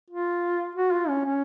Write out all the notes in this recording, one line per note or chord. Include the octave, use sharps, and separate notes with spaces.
F4
F#4
F4
C#4
C#4